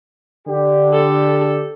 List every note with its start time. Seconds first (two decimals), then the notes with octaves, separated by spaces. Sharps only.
0.47 D3 G4
0.94 A4